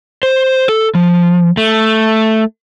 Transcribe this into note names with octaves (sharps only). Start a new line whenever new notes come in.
C5
A4
F3
A3